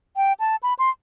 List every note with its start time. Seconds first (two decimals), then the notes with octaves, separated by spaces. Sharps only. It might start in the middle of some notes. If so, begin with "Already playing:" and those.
0.17 G5
0.40 A5
0.63 B5
0.79 C6